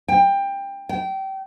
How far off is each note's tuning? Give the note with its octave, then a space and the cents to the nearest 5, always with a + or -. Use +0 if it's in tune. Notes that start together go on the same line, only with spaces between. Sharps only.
G5 +20
G5 -25